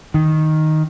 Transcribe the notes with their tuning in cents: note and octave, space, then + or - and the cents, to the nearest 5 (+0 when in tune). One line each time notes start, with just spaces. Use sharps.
D#3 +0